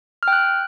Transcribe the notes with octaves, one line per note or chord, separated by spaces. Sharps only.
F6
G5
F#6